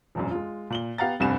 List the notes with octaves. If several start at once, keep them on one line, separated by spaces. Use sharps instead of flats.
E1 A#1 F#2
G#3 F4
A#2 F#7 G7
B3 G4 F5 F#5 A#5 A6
F1 C2 G2 C3 G#5 E7